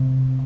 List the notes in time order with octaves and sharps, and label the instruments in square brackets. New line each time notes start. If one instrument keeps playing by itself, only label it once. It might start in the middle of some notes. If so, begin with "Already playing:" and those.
Already playing: [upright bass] C3